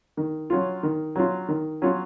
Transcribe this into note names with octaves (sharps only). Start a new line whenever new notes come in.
D#3
F#3 C#4 F4
D#3
F#3 C#4 F4
D#3
F#3 C#4 F4